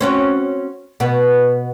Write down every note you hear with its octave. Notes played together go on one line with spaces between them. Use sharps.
C4 C#4 F#4
B2 B3